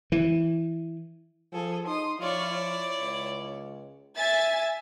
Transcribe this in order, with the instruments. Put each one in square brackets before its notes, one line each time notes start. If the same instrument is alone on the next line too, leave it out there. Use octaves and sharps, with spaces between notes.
[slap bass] E3
[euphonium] F3 [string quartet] G#4 A4
[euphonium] D#4 [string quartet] C6 D#6
[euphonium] F3 [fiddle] E4 D5 [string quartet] F4 C#5 C#6
[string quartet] C#5
[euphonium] C#2
[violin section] E5 G#5 A6